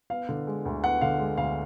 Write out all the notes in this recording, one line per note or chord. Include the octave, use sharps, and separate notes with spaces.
B3 F5
D3
G#3
D2
B3 F#5
D3 F5
G#3
D2 F5